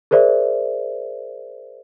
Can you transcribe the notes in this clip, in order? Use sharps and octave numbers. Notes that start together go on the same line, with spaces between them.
G#4 A#4 C5 D5 E5